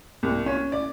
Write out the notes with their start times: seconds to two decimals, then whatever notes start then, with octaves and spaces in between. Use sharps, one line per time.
0.23 C2
0.46 C#4
0.72 D5